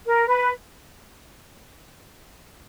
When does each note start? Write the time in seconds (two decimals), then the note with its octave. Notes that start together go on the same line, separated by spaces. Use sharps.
0.06 A#4
0.27 B4